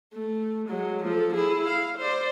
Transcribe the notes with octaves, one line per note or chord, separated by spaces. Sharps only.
A3
F#3 G#3
F3 A4
E4 G#4
F5
C5 D5